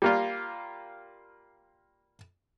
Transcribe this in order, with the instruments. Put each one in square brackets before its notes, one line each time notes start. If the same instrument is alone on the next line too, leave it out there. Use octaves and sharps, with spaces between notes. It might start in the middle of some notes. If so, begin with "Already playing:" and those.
[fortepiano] G3 A#3 F4